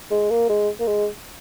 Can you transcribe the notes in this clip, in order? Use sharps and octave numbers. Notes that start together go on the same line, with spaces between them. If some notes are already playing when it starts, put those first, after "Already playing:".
G#3
A#3
G#3
A#3
G#3